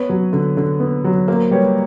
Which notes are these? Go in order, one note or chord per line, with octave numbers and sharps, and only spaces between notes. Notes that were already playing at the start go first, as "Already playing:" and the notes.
Already playing: B3 B4 C#5
F#3
D3
D3
B3
F#3
A#3 A#4 C5
G3 B4 C#5